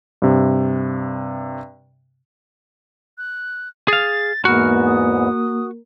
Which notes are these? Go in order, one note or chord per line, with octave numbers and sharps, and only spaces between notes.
G2 C3
F#6
G#4 F5 A6
E2 G#2 A#3 B3 F#4 A#4 F6
D#6